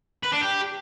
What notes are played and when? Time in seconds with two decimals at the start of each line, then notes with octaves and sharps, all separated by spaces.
0.23 B4
0.32 D4
0.41 G4